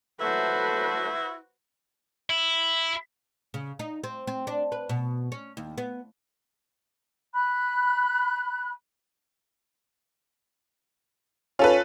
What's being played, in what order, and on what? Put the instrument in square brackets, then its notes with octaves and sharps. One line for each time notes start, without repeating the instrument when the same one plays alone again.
[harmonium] F#3 A3 A4 [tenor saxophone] E4 [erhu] F#4 [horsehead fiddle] B4 C5
[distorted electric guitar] E4
[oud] C#3
D#4
C4
C4
D4
B4
B2
C#4
D#2
B3
[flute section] B5 F#6
[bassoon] C#4 [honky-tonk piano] F4 A4 B4